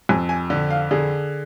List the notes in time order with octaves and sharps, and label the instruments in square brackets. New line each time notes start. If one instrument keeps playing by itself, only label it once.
[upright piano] F2 G#5
G#5
D3
F5
D3 G#4